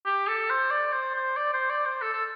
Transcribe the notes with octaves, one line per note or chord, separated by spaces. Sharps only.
G4
A4
C5
D5
C5
C5
D5
C5
D5
C5
A4
A4